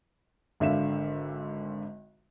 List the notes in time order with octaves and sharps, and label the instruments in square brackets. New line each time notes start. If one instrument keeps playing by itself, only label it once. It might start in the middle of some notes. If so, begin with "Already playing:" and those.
[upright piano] G#1 D3 E5 F5 E7